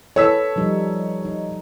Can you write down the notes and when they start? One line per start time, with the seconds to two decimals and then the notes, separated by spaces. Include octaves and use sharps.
0.16 A4 B4 C#5 E6 B6
0.56 F3 G3 D#4
1.25 D#4